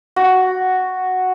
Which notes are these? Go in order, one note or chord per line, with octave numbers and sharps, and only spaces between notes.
F#4